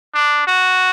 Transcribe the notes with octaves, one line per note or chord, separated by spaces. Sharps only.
D4
F#4